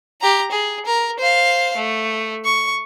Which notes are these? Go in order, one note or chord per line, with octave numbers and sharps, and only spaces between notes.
G4 A#5
G#4
A#4
C5 F5
A3
C#6